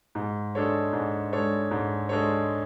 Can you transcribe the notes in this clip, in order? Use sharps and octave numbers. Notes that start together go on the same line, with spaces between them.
G#2
G#3 D4 A4 C#5
G#2
G#3 D4 A4 C#5
G#2
G#3 D4 A4 C#5